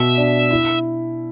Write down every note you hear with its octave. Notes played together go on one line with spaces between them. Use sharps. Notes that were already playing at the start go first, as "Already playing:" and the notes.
Already playing: B2 E5
D4
E4